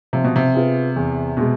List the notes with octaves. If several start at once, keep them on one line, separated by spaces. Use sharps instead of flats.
C3 F3
B2
C3
B3 F4 G#4
E2
B2 G#3